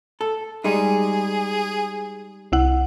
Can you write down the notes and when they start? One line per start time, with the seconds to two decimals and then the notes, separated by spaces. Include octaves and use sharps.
0.21 A4
0.64 G3 G#3 D#4 G#4
2.52 C2 E4 F#5